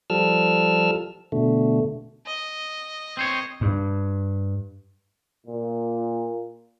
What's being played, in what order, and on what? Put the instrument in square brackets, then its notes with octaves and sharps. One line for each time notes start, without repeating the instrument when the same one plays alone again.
[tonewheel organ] F3 G3 A4 E6 F6
B2 D3 A3
[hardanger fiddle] D#5
[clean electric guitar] C4 C5 C#5
[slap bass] G2
[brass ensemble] A#2